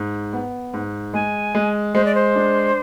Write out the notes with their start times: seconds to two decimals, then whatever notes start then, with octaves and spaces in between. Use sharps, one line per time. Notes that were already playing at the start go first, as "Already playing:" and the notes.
Already playing: G#2
0.33 B3
0.74 G#2
1.14 G#3 G#5
1.55 G#3
1.95 G#3 C5
2.05 D5
2.15 C5
2.35 D4